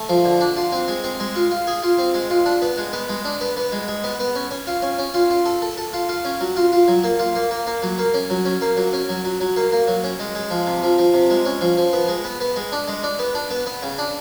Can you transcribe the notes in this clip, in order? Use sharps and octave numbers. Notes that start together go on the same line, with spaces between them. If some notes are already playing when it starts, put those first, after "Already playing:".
Already playing: A3
F3
D3
D4
F4
C4
G#3
C4
G#3
F4
F4
G#4
F4
C4
G#3
F4
D4
B3
G#3
B3
G#3
D4
B3
B3
G#3
G#3
B3
B3
C#4
C#4
F4
C#4
C#4
F4
F4
A4
A4
A4
F4
F4
C#4
F#3
F4
F4
F#3
A#3
F4
A#3
A#3
A#3
F#3
A#3
C#4
F#3
C#4
A#3
F#3
C#4
F#3
F#3
F#3
A#3
A#3
F#3
C#4
G#3
G#3
F3
C3
F3
F3
C3
G#3
C#4
F3
F3
B3
G#3
B3
B3
G#3
D4
G#3
D4
B3
D4
B3
B3
C#3
D4